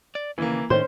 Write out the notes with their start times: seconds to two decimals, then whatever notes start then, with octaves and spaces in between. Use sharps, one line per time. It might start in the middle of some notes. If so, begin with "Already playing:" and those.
0.15 D5
0.38 D#2 C#3 E3 A#3
0.70 A2 D#3 C#4 C5 C6